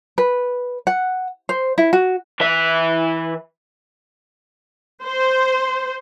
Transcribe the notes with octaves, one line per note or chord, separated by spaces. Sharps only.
B4
F#5
C5
E4
F#4
E3 E5
C5